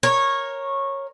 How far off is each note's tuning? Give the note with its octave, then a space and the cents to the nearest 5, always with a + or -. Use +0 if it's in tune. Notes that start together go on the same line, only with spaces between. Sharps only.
A#4 +0 C#5 -15